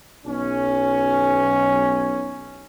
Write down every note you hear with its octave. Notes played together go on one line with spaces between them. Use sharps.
B1 C#4